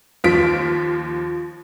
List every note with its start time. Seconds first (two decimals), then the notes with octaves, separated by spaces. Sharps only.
0.24 D#2 F3 F4 B6 D7